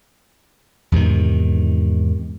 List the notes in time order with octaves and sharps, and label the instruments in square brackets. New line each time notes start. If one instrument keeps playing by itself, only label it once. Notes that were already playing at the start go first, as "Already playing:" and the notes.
[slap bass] E2 G#2 C3 D#3